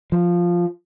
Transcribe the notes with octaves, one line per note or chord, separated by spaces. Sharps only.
F3